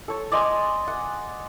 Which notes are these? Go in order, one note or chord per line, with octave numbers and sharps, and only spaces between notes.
A4 C#5
D5 D#5 G#5 C6
F#5